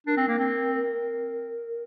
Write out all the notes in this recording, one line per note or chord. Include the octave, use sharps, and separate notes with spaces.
D4 A#4
C4
A#3
C4